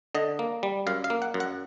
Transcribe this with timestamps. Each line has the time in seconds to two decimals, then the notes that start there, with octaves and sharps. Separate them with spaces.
0.15 D3 D#5
0.39 A#3
0.63 G3
0.87 F#2 F5
1.04 F5
1.10 A#3
1.22 F#5
1.34 F#2
1.40 F#5